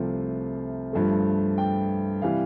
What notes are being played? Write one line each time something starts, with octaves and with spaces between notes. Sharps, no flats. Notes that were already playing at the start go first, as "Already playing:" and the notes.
Already playing: C2 C3 F3 A3
G2 F3 A3
G5
C3 E3 G3 F5